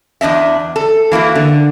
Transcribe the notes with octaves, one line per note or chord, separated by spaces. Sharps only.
E2 D4 D#5 E5
A4
E3 A#3 E4 F#4
D3